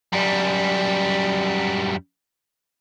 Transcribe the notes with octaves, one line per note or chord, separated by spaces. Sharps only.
F#2 G3